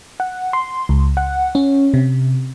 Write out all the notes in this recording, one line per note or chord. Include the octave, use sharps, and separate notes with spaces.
F#5
C6
C#2
F#5
C#4
C3